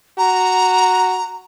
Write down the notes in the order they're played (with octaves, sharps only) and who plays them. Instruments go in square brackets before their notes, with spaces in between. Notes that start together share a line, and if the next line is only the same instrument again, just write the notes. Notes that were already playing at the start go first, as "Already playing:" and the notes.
[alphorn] F#4 [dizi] A#5